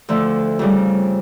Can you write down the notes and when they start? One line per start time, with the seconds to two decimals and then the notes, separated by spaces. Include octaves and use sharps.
0.09 D2 D3 F3 A3
0.59 F2 C#3 G3